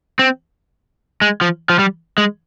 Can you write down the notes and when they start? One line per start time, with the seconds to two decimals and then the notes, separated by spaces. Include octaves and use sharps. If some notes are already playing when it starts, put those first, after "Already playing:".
0.19 C4
1.22 G#3
1.41 F3
1.69 F3
1.79 G3
2.18 G#3